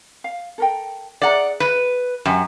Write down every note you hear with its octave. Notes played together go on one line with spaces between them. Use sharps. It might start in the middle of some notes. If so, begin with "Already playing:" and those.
F5
A4 A#4 G5
G#4 D5 F#5 A#5
B4
F#2 G4 G#5